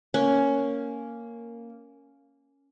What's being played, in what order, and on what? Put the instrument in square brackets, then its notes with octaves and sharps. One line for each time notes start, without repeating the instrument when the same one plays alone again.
[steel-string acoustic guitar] A#3 [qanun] C#4